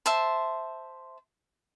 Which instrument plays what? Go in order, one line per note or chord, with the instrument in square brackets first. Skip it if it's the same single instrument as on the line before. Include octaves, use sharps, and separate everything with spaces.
[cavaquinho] C5 E5 A5 C6